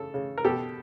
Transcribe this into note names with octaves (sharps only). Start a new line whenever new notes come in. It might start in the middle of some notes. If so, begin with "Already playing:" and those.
Already playing: C#3 A4
C#3
A#4
B2 G4 A4